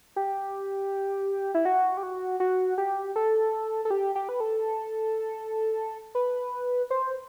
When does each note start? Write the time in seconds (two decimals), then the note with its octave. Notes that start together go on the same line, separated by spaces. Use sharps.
0.16 G4
1.54 E4
1.65 F#4
1.97 G4
2.03 F#4
2.40 F#4
2.78 G4
3.16 A4
3.85 A4
3.90 G4
4.15 G4
4.29 B4
4.40 A4
6.15 B4
6.90 C5